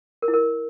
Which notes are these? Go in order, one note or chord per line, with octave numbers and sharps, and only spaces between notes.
A#4
E4
A#4